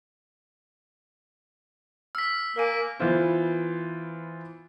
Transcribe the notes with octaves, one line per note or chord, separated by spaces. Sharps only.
E6 F6 B6
A#3 A#4 F5 G#5
E3 B3 F4 C5